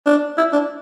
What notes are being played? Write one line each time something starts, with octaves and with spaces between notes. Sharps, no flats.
D4
E4
D4